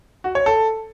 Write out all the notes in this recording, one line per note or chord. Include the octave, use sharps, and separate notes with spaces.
F#4
C#5
A4